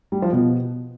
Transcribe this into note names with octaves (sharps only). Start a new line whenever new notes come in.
G3
F3
B2